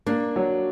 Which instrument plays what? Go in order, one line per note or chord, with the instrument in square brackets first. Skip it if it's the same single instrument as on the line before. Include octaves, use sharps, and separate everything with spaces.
[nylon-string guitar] A#3 [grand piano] D4
[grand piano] F#3